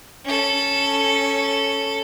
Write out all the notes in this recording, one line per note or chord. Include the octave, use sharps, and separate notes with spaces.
C#4 A4